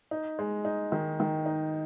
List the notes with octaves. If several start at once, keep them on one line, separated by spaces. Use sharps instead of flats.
D#4
G#3
D#4
D#3
D#3
D#4